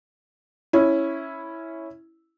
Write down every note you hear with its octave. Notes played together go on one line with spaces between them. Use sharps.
C#4 E4